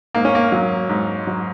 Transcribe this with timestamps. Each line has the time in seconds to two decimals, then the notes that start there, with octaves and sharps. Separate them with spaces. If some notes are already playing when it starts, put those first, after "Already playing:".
0.15 G#2 A#3
0.25 C#4
0.35 A#3
0.52 F#3
0.89 G#2
1.27 F#3